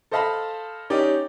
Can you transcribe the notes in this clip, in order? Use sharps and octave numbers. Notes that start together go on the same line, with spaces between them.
A4 C5 D#5 F5 A5 B5
C#4 D#4 G4 D5